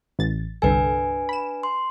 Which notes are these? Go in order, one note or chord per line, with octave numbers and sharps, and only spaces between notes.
A1 A6
G1 C2 D4 A4 B4 G#5
B5 E7
C6